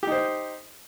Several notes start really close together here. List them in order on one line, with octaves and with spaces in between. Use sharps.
G4 D#4 C5